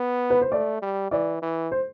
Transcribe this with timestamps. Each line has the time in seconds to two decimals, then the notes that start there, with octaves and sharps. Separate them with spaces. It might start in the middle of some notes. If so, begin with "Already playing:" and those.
Already playing: B3
0.30 B4
0.41 C5
0.51 A3 D5
0.82 G3
1.11 E3 D5
1.42 E3
1.72 C5